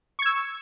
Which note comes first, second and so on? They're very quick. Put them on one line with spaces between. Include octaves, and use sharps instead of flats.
C#6 G#6 E6